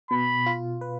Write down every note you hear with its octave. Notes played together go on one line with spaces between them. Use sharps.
B2 B5
F4
B4